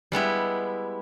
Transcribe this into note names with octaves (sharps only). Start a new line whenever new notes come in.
G3 G#3 B3 E4